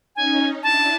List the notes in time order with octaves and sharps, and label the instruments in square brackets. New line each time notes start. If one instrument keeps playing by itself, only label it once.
[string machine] C#4 D#4 [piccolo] G#5
[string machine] D4 E4 [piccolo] A5